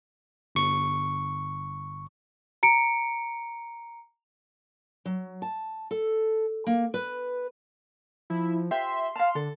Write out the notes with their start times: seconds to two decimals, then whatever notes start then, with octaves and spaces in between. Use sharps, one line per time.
0.55 G1 C#6
2.63 A#5 C#7 D7
5.06 F#3
5.42 A5
5.91 A4
6.67 A#3
6.94 B4
8.30 F3 E4
8.71 F4 G4 C5 E5 C6
9.16 F5 A5 F6
9.35 D3 A4